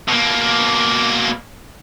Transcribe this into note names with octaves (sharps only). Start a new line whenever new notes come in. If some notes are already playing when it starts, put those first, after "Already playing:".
B2 A#3